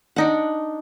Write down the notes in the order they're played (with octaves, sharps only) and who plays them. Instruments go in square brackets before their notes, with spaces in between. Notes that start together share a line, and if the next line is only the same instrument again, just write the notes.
[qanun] D4 D#4 F#5